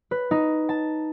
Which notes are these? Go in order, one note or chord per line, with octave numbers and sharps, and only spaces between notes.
B4
D#4
A5